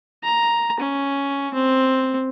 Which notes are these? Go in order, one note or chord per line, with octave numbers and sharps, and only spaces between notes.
A#5
C#4
C4